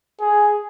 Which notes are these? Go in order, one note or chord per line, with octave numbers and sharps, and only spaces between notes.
G#4